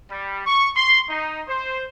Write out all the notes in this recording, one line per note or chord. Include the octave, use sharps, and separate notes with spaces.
G3
C#6
C6
D#4
C5